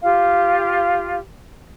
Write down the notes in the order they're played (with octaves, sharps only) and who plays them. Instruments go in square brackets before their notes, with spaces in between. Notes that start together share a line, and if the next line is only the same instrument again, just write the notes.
[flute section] F4 G4 F5